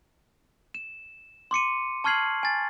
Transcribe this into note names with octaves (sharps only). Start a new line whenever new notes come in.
E7
C6 D6 C#7 D#7
A5 C#6 F6 G#6 C7 F#7
G#5 A6